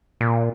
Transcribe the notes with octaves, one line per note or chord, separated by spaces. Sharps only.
A#2